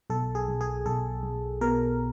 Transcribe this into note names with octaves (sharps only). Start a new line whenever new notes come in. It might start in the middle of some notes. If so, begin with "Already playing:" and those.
B1 A4
G#4
B1
G#4
B1 A4
B1
B2 A#4